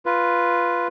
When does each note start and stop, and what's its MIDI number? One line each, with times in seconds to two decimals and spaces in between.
0.06 0.88 65
0.06 0.88 71